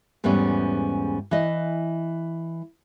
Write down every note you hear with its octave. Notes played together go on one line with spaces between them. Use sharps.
E2 G#2 G3 A3 B3 C#4
E3 D#5